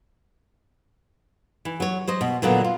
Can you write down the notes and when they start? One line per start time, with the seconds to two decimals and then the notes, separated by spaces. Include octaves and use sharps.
1.65 E3
1.80 F#3 C#5
2.07 F#3 C5 D#5
2.21 B2
2.42 A#2 D3 F#3 A#3 B3
2.64 F4